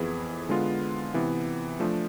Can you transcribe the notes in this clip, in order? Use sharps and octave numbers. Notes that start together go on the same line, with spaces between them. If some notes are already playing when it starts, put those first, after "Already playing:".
Already playing: F2 E3 B3 E4 G#4
D3 G#3 B3 F4
C3 E3 B3
F3 A3 D4